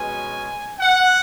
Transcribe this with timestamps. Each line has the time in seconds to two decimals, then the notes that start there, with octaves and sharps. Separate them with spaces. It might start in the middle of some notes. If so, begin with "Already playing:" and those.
Already playing: B2 G#3 C#4 G#5
0.81 F#5